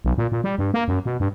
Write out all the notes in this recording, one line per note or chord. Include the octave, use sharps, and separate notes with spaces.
B1
A#2
A#2
G3
G2
A#3
F#2
B2
G2